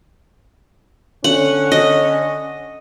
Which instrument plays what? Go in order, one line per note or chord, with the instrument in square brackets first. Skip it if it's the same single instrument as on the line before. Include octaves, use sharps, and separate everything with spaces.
[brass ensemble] D3 C#4 [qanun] F#5
[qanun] D#5